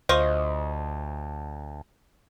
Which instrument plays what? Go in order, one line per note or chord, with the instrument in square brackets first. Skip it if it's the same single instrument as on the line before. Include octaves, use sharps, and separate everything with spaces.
[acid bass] D2 [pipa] F4 D#5 [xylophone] C5 C#6